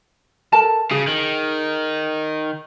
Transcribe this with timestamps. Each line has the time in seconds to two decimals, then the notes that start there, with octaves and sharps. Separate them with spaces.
0.52 A4 A#4 A5
0.91 C#3 G#4
1.08 D#3